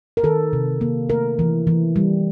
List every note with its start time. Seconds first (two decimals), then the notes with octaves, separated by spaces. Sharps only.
0.17 A#4
0.23 D#3 A4
0.53 C3
0.81 A#3
1.09 A3 A#4
1.39 E3
1.67 E3
1.96 G3